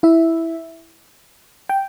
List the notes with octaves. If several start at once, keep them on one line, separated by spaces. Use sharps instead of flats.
E4 E5
G5